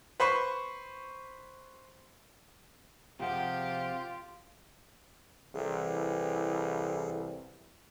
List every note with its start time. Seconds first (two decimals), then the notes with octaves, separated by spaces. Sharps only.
0.20 B4 C5 B5 C#6
3.20 C3 F3 F4 G4 G#4 F#5
5.55 C2 E3 G#4 A4